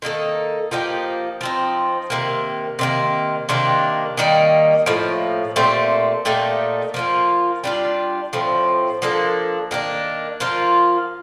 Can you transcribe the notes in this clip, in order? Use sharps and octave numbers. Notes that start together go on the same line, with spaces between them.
D#3 A#3 D#4 A4
F3 A#3 D#4 G4
F3 C4 D#4
C3 D#3 A#3
C3 D#3 A#3
C3 D#3 A#3 D4
D#3 G3 A#3 D#4
A2 F3 A#3
A#2 A3 C4 G4
A#2 A3 D#4 G4
F3 A#3 F4
G3 D4 F4
A2 F3 C4
F3 A#3 D4 A4
D#3 A#3 D4
F3 A#3 F4